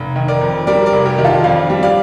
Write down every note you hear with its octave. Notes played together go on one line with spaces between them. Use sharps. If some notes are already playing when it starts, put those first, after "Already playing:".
Already playing: F1
D#3
A#4 D5
F2
G3 A#4 D5
A#4 D5
F1
G4 A#4
D#3
F4 A4
F2 D5 F5
G3
D5 F5